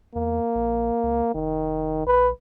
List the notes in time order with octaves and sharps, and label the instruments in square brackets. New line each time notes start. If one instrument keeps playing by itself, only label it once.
[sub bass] E2 [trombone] A#3
[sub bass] A#1
C#2
[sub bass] F1 [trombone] D#3
[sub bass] A#1 [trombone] B4